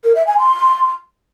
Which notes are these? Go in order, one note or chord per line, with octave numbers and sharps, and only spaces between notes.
A#4
E5
G#5
C6